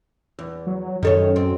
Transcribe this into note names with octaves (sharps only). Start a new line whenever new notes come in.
E2
F#3
F#2 D#3 A4 C#5
C4